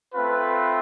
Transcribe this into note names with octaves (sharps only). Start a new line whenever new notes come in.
A3 C4 F4 B4